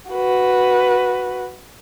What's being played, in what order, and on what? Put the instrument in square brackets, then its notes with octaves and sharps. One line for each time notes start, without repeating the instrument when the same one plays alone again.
[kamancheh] F#4 B4